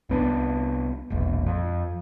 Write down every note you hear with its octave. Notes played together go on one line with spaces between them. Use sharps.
C2 B3 D4
E1 A#1
F2